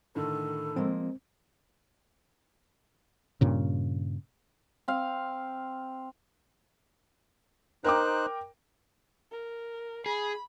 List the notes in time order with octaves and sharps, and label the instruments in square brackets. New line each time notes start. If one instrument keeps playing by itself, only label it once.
[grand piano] A2 D3 D#3 [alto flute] A4
[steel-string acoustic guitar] F3 G#3 A#3 [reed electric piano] C4
[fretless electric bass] G2 A#2 C#3
[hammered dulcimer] C4 F5
[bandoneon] D#4 C5 F#6 [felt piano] A#4 G5 D6
[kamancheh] A#4
[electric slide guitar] G#4 [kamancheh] B5